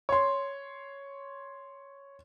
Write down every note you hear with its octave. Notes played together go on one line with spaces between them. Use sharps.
C#5 C6